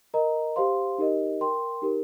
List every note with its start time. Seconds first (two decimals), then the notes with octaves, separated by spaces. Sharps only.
0.14 A#4 D#5 A#5
0.56 G4 C5 F5 C6
0.98 D#4 G4 A#4 D#5
1.41 A#4 G5 C6
1.82 D#4 G4 A#4